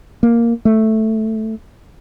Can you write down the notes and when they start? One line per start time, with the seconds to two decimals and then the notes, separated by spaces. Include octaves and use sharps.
0.23 A#3
0.65 A3